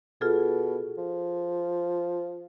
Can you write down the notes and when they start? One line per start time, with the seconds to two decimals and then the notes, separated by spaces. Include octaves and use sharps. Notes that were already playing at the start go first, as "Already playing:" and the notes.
0.21 B2 F4 G#4 A4
0.97 F3